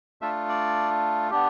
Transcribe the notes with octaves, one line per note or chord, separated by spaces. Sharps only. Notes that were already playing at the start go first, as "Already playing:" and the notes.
A3 D4 F4 E5
D5
B3 D4 G4